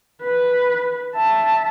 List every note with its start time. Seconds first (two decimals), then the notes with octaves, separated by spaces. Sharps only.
0.23 B4
1.15 E5 A5